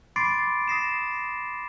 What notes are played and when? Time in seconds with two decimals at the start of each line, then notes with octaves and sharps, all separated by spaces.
0.16 B5 C6 D6 A6 C7 D7
0.68 D#6 A#6 C7 E7